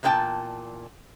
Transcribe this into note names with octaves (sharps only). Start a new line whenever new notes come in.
E2 A#2 A#3 D4 G5 A5